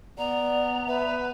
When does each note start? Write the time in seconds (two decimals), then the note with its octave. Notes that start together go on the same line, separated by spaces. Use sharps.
0.18 B3 D5 A#5
0.87 B4 E5